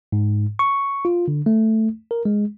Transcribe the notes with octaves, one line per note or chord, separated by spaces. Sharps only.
G#2
C#6
F4
D3
A3
A#4
G#3